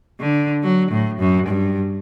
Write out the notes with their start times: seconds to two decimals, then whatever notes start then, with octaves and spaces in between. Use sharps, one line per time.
0.20 D3
0.63 F#3
0.91 A2
1.19 F#2
1.48 G2